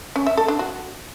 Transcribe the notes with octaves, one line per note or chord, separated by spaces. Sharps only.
C#4
E5
A4
D4
F#4